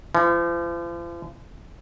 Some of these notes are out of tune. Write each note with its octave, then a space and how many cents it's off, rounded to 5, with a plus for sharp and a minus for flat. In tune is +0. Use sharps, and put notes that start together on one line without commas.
F3 -40